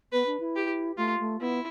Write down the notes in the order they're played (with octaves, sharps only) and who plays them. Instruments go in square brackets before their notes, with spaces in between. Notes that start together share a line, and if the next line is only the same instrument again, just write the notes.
[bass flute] B3 [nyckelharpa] B4
[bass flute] D4
E4
[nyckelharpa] G4
[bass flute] A3 [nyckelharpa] F4
[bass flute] A3
[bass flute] B3 [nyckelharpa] E4